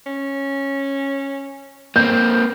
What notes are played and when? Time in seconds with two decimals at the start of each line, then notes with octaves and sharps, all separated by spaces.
0.06 C#4
1.96 A#3 C4 G6